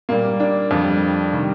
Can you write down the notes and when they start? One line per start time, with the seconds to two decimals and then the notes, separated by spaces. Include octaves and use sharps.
0.09 A#2 G3 A#3
0.40 D4
0.71 F2 D3 G3
1.32 C3 D#3 G3